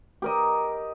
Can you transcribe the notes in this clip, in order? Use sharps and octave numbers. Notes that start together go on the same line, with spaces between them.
G4 A#4 D#5